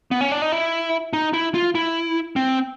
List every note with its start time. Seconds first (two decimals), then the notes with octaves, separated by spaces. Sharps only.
0.11 B3
0.21 C#4
0.31 D4
0.42 D#4
0.52 E4
1.13 D#4
1.33 E4
1.54 F4
1.75 E4
2.36 C4